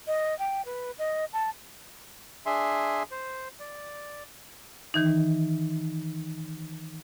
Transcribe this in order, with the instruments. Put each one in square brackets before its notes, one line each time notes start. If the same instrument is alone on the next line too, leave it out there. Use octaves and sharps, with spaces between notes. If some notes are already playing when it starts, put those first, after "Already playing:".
[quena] D#5
G5
B4
D#5
A5
[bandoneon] D4 G#4 E5 G#5 C6
C5
D5
[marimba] D#3 E3 D#4